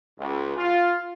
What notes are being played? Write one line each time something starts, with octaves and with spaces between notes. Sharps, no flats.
C#2
F4